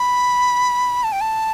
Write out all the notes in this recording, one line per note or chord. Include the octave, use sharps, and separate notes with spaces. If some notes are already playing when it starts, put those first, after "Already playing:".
Already playing: B5
A5
G5
A5